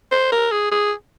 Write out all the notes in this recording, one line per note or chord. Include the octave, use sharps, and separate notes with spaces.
C5
A#4
G#4
G#4